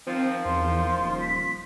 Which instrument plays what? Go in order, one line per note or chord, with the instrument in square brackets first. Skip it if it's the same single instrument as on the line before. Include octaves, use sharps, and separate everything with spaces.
[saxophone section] D#3 F3 [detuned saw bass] C4
[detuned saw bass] E2 [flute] C6
[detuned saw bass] D#1
[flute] B6